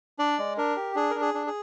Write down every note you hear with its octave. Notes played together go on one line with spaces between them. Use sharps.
D4 D5
G#3
D4 A#4
G4
D4 G#4
D4 A#4
G#4
D4
G#4